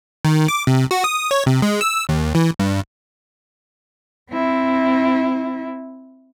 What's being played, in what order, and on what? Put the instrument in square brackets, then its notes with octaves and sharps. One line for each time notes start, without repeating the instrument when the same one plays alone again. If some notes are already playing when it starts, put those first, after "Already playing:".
[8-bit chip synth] D#3
D6
C3
F#4
D#6
C#5
C3
G#3
E6
D#2
E3
G2
[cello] C4 E4